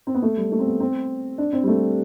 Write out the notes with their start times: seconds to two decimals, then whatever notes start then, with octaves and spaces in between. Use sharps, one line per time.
0.07 C4
0.15 B3
0.22 A3
0.37 G3
0.52 A3
0.59 C4
0.66 B3
0.80 C4
1.38 D4
1.53 C4
1.64 G3
1.68 A3